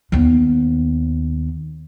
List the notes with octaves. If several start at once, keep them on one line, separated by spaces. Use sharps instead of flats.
D#2 B3